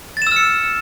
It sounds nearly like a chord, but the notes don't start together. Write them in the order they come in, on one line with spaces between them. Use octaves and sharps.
A6 E7 E6 F6 C#7